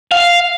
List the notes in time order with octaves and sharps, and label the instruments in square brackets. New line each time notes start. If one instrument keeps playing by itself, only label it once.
[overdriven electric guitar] F5